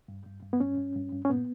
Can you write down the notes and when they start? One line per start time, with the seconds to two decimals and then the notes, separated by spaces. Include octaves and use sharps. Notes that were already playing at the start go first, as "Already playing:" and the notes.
0.08 G2
0.26 G2
0.43 G2
0.53 B3
0.60 G2 C#4
0.78 G2
0.96 G2
1.12 G2
1.25 C#4
1.30 A#2 B3